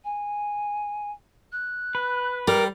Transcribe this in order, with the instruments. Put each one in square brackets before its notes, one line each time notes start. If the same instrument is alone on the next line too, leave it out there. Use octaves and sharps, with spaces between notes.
[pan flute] G#5
F#6
[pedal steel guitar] B4
[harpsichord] G3 [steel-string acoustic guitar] A#4 [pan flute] G5